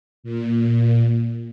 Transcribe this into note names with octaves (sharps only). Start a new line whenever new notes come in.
A#2